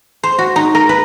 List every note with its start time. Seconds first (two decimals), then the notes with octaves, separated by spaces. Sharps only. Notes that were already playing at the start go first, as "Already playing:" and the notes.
0.23 C5
0.38 F#4
0.56 D#4
0.75 A#4
0.89 B4